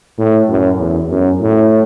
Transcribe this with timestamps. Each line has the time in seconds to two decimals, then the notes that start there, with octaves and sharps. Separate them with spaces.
0.18 A2
0.49 F#2
0.79 E2
1.11 F#2
1.41 A2